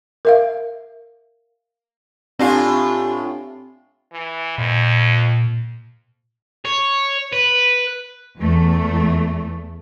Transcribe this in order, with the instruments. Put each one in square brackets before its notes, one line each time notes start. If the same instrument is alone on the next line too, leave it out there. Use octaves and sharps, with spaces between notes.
[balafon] A#4 E5 F5
[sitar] A2 D4 F4 [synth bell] C4 F5 C7 [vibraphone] G4 G#5
[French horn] E3
[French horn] F2 [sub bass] A#2
[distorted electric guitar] C#5
B4
[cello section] E2 A3